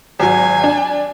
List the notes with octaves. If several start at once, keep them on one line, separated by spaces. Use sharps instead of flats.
G#1 F#3 G#5
D4